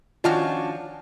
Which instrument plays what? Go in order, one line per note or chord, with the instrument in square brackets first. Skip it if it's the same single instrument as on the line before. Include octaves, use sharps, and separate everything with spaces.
[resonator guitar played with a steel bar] D#3 F3 F#4 [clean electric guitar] C#4 D4 [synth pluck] F4 F6